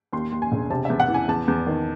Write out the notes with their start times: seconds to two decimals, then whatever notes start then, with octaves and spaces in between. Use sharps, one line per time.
0.13 D#2 C6
0.32 D#2
0.42 G#5
0.52 E1
0.70 C3 A5
0.85 E2 E5
1.00 F#5
1.09 E3
1.14 G#5
1.28 E2 A5
1.48 E2
1.67 D#3